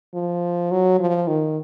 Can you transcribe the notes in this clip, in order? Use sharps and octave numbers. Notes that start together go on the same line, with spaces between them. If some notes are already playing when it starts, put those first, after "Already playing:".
F3
F#3
F3
D#3